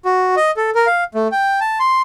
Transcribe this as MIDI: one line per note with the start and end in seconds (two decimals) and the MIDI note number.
0.05 0.35 66
0.37 0.51 75
0.57 0.70 69
0.75 0.86 70
0.87 1.04 77
1.14 1.28 57
1.32 1.60 79
1.61 1.79 81
1.80 2.02 84